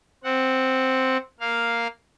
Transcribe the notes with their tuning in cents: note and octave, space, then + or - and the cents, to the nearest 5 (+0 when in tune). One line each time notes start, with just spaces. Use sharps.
C4 +0 F#5 +0
A#3 +0 F5 +0